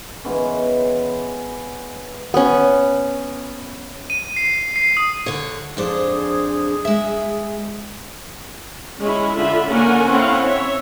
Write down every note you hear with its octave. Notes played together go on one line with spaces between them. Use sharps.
E3 G#3 B3 C#4
B3 C#4
D#7
C7
C7
D#6
D3 C#5
F2 D4 G#4 C5
G#3 E5
G#3 C#4 E4
D3 F4 E5 B5
D3 A#3 C#4 A#4 F#5 G#5
C4 C#4 E4 F5 F#5
C#5 E5